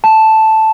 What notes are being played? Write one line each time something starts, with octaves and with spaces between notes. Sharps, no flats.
A5